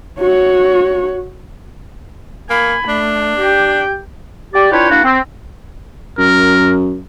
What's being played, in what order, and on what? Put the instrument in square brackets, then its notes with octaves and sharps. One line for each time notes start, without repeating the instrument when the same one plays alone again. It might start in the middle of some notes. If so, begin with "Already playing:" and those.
[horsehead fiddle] F#4 C#5
[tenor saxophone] A#3 [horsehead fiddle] G#5 B5
[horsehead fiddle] A3 [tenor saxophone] D4
[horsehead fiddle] G4 G5
[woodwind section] G4 D5
D4 E4 F4 B4 C#5 G5
A#3 D4 E4 F#4
C4
[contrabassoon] F#2 [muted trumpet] A#4